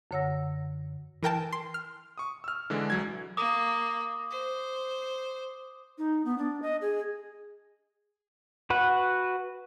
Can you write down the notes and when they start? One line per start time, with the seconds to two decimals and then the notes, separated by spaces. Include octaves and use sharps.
0.11 F#2 D3 C#5 F#5 E6 A#6
1.23 E3 A#4 G5 A5
1.52 C6
1.74 F6
2.18 C#6 D#6
2.44 E6 F6
2.70 D3 E3 G#3 D4
2.90 C2 F#3 G#6
3.37 A#3 D6 D#6
4.31 C5
5.98 D#4
6.25 B3
6.38 D4
6.62 D#5
6.82 G#4
8.70 F#4 B4 F#5